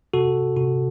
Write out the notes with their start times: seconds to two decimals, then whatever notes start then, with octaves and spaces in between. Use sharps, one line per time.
0.13 C3 F#4 A4
0.57 C3 F#4